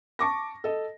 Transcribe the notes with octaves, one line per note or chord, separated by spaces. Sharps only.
A5 C#6 D6 A#6
A4 D#5